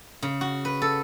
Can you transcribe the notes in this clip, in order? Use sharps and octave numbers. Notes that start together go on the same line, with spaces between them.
C#3
F#4
B4
A4